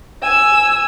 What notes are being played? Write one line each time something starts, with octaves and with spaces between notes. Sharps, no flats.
G#5 E6